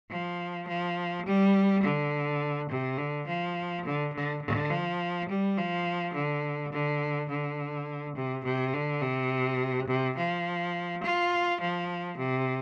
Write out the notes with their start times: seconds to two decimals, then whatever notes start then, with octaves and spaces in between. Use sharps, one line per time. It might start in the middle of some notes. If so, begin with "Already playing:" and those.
0.11 F3
0.68 F3
1.26 G3
1.83 D3
2.69 C3
2.98 D3
3.27 F3
3.85 D3
4.13 D3
4.42 D3
4.70 F3
5.29 G3
5.58 F3
6.15 D3
6.72 D3
7.29 D3
8.16 C3
8.44 C3
8.73 D3
9.02 C3
9.88 C3
10.18 F3
11.04 F4
11.61 F3
12.18 C3